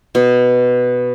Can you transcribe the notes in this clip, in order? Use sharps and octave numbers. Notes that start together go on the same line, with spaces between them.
B2